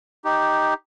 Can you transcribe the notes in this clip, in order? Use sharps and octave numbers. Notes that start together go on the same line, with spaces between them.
D#4 G4